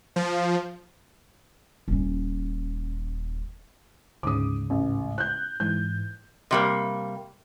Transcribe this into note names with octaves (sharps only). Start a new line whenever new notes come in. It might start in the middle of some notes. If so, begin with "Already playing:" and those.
F3
D#1 C#4
D2 G#2 C#3 D6 D#6
A1
F#6 G6
G#2 E3 G6
C3 G3 A#3